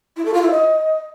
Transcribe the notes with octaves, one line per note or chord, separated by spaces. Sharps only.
E4
A4
F4
E4
D#5